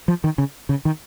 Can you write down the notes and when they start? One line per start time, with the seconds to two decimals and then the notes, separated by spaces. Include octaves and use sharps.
0.08 F3
0.24 D#3
0.38 C#3
0.69 C#3
0.85 D#3